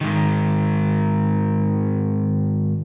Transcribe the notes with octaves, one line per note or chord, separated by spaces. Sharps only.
G#2 D#3